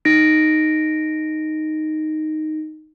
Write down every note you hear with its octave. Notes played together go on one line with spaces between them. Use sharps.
D#4 A#6 D7